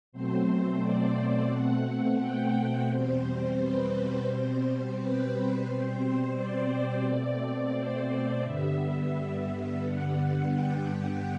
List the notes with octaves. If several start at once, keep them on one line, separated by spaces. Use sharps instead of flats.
B2 F#3 A3 C4 C5
D5
B2 A3 C4 F#5
G5
E2 B2 G3 C4 C5
B4
B2 G3 C4 C5
B4
B2 G3 C4 C5
C5
D5
B2 A3 C4
C5
G2 D3 G3 B3 E5
G2 D3 G3 B3 F#5
G5